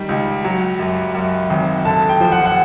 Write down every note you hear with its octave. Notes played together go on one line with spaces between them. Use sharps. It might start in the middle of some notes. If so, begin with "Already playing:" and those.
Already playing: D#3 G3
C#2
F#3
F#2
F#2
G#1
D3 A5
G5
F3
F#5
F#5